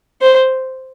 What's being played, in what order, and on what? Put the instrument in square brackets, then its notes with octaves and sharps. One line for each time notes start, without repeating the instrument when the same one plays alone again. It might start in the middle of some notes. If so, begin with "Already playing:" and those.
[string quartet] C5